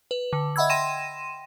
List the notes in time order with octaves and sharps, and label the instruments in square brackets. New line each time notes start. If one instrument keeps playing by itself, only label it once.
[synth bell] B4
D3
D#5 E5 F#5 B5 E6 G#6
G5 C6 A#6 D#7 E7